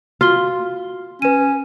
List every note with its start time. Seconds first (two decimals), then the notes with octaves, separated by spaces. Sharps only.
0.21 F4 F#4 G7
1.22 C#4 B4 D#7